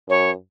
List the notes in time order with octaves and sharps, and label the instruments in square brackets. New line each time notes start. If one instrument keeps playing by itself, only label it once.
[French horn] F#2 [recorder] C#5